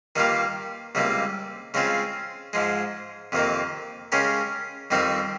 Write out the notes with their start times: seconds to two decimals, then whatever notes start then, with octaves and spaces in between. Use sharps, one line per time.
0.16 G2 D#3 G3 A#3 F4
0.95 C#2 C3 G3 A#3
1.74 C#3 G#3 C4 F4
2.53 G#2 F3 G#3
3.32 F2 C3 D#3 A#3
4.12 C#3 G#3 C#4 G4 A#4
4.91 F2 D#3 G3 C4 D#4